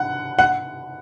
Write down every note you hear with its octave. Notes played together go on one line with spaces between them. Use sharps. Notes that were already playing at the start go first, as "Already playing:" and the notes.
Already playing: F#5
F#5